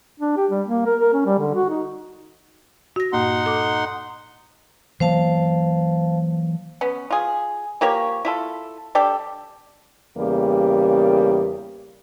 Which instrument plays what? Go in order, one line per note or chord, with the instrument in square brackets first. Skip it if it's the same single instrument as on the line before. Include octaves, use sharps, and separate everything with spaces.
[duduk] D4
G4
G3
A#3
A#4
A#4
C#4
G3
D3
F#4
D#4
[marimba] F#4 A#6
[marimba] G2 A#2 A#3 [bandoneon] D#4 F#5 C6
[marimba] A4 D6
[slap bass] E3 F#3 A#3 [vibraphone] C5 F5 A5
[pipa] B3 C#4
F4 G#4
F3 A#3 G4 C#5
E4 F4 A4
G3 D4 G4 A4
[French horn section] E2 C#3 G3 A#3 G4